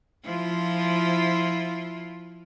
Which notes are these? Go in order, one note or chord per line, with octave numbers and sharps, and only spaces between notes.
F3 E4 F4